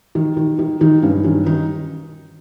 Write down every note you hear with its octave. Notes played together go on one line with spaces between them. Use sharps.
D#3
D#3
D#3
D#3 D#4
G2 C#4
D#3 C#4
D#3 D#4